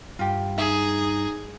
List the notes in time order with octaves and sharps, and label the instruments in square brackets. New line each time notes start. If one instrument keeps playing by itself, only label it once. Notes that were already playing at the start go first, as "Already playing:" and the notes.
[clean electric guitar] G2 [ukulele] F4 G4
[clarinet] D#4 [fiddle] G#4 [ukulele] E5